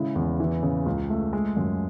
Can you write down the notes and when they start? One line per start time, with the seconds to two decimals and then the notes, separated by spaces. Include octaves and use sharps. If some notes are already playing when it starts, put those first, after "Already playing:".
Already playing: C#3 G#3 E4
0.16 E2
0.40 E3
0.63 C#3
0.86 C#2
1.10 A3
1.33 G#3
1.57 F#2